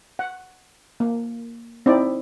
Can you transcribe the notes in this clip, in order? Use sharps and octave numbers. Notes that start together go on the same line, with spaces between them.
F#5
A#3
C4 D#4 E4 D5